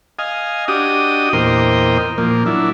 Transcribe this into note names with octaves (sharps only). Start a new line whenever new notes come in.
D#5 F5 G#5
D4 F#4 G4 D#5 D#6
E2 A#2 A#4 C5 D#5 G5
A#2 F3 A#3
F#3 D4 E4